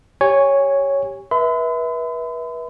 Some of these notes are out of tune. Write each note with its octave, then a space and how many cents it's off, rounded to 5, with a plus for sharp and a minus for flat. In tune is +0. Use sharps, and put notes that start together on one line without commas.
G4 +0 C#5 +0 G#5 -20
B4 -30 E5 -20 B5 +45